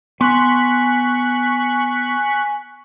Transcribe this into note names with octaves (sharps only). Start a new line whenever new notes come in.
B3 G#5 C6 C#6 F#6 B6